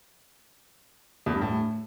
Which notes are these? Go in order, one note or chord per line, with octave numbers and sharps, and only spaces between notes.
E2
G2
A2